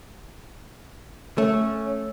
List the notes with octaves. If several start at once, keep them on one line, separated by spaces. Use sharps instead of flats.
A3 C#4